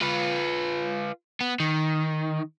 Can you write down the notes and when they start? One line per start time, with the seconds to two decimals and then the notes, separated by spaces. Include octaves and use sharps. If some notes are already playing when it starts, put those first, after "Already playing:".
0.01 F4 B4
1.41 B3
1.60 D#3